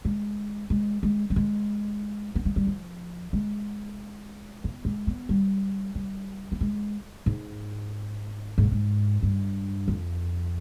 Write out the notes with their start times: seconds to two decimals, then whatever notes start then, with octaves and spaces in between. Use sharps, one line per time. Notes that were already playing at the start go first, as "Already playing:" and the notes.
0.05 G#3
0.70 G#3
1.03 G#3
1.30 G3
1.36 G#3
2.35 B3
2.45 G#3
2.56 G3
2.67 F3
3.33 G#3
4.64 B3
4.85 G#3
5.07 B3
5.29 G3
5.95 G3
6.52 B3
6.61 G#3
7.26 G#2
8.58 G#2
8.64 B2
8.72 G#2
9.23 G2
9.88 F2